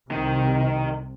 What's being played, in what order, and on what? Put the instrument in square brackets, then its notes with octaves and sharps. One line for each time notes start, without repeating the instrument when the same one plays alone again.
[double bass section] C2 C3 [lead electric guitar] D#3